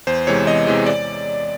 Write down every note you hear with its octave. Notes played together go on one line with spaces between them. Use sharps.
E2 C5
C3 E3 G#3 C#5
E2 D#5
C3 E3 G#3
D5